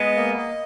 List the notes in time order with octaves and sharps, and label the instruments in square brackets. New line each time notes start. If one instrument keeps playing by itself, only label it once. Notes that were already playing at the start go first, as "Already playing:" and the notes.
Already playing: [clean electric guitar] G#3 B3 [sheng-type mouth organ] D#5
[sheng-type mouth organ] A#3
D#5